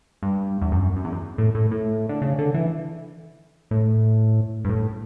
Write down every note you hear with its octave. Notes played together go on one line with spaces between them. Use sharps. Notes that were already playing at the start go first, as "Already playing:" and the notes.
G2
E2
F#2
F#2
E2
F#2
A2
A2
A2
D3
C#3
D3
E3
A2
G2
A2